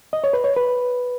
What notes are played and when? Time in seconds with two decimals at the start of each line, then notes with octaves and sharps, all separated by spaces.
0.13 D#5
0.24 C#5
0.33 B4
0.44 C#5
0.56 B4